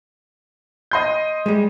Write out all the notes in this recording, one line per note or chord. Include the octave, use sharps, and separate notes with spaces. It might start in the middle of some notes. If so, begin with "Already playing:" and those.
D#5 C6 G6
G3 G#3